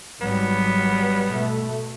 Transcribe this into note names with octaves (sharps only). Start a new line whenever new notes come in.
G#1 F#3 G3 B3
B2 A3